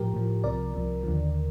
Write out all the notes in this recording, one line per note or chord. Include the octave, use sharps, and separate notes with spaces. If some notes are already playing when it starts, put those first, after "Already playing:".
Already playing: A2 F3 G4 A#4
A2 F3
C2 C3 F3 A#4 D5
C2 C3 F3
D#2 D3 F3